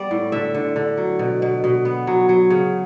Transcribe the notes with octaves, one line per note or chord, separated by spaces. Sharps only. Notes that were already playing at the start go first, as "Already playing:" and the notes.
Already playing: G3 B3 D5
A2
D3 E5
D3
D3
F#3
B2
B2
B2
B3
F#3
F#3
C#3